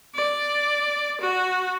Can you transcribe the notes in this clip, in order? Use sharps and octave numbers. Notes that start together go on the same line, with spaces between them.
D5
F#4